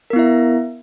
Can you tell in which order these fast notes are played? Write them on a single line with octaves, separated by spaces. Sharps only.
A#4 B3 E4 E5